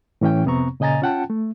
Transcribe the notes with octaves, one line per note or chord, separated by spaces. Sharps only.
A2 E3 C#4 G5
F2 C3 B3 C4 A#5 C#6
A#2 C#3 D#5 G#5 A#5 A6
C#4 F4 F#5 G5 A5
A3